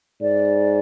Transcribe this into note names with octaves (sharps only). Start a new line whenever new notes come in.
G#2 D5